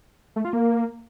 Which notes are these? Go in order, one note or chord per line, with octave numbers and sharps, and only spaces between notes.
A3
F4
A#3